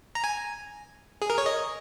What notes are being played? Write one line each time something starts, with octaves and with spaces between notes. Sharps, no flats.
A#5
G#5
G#4
A#4
C#5
D#5